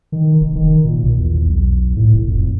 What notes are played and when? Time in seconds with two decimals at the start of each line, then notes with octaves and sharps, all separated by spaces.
0.12 D#3
0.41 F1
0.55 D#3
0.84 A#2
1.03 A#1
1.18 E2
1.48 B1
1.96 A2
2.14 F1
2.28 F2